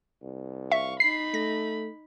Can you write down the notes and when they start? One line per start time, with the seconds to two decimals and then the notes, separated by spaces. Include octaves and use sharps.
0.22 C2
0.72 E5 F5 C#6
1.00 D#4 B5 C7
1.34 A3 A#6